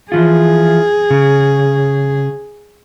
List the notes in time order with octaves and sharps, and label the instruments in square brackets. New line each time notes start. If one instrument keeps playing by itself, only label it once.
[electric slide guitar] E3 F3 F4 [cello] G#4
[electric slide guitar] C#3